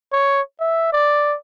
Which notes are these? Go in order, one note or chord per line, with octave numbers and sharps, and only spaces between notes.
C#5
E5
D5